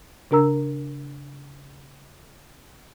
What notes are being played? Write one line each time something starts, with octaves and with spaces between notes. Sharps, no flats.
C#3 D4 A#4 A#5 E6